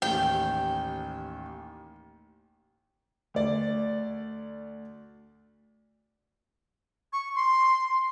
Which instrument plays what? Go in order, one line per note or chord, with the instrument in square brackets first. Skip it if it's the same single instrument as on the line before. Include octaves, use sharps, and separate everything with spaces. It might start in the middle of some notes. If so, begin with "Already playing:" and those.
[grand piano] A1 D#2 [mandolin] G5
[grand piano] D2 D5
[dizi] C#6
C6